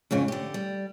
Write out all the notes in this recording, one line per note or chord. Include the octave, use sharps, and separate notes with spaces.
F2 G#2 C#3 C#4
D3 G4
G3